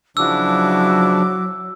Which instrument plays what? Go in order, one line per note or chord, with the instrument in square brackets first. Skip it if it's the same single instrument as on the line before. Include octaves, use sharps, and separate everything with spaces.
[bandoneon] C#3 F3 D4 [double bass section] F#3 [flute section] E4 F#4 D6 [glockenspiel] E6